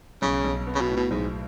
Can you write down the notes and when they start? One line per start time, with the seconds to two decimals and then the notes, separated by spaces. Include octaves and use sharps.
0.22 B1 C#3
0.45 B1
0.67 B3
0.75 C#3
0.81 B2
0.89 A2
0.97 B2
1.11 B1 G#2